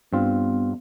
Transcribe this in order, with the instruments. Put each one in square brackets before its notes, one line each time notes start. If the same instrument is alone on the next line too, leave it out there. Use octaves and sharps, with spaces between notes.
[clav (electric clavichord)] G2 C4 F4 [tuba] B3